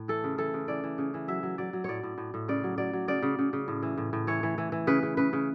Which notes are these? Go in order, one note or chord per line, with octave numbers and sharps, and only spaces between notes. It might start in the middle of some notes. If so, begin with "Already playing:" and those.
Already playing: A2
E3 A4
C#3
E3 A4
C#3
E3 D5
E3
C#3
E3
F#3 E5
F#3
F#3 D5
F#3
A2 C#5 D5
A2
A2
A2
C#3 D5
F#3
F#3 D5
F#3
C#3 D5
C#3
C#3
C#3
A2
E3
A2
A2
E3 C#5
E3
E3
E3
C#3 B4
C#3
C#3 B4
C#3